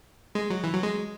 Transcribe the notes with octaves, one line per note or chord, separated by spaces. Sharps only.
G#3
F#3
E3
F#3
G#3